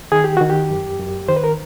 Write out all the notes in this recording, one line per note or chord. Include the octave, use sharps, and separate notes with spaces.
D#3 G#4
G4
D#3 F#4
G4
F#2
F#2
D#3 C5
B4
A#4